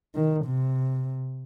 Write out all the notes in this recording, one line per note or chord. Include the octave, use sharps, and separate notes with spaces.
D#3
C3